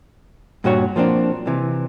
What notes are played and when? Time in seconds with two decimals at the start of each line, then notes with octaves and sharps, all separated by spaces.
0.64 G2 A#2 F#4 C#5
0.96 F3 A#3 C4 D4
1.47 C3 E3